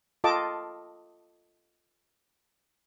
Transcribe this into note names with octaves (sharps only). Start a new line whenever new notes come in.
F4 A4 D#5 G5 A5 D6